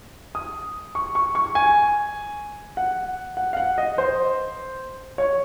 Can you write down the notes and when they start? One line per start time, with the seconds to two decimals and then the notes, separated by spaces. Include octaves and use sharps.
0.35 D#6
0.95 C#6
1.15 C#6
1.35 C#6
1.55 G#5
2.77 F#5
3.37 F#5
3.53 F5
3.57 F#5
3.78 D#5
3.98 C5
5.18 C#5